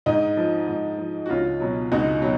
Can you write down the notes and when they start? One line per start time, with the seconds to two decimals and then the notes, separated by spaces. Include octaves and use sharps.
0.06 G#2 D#4
0.37 F3
0.68 G#2
0.98 F3
1.26 F#4
1.30 C#2 C#4 F4
1.60 B2 F#3
1.92 C#2 D#4 F#4
2.22 B2 F#3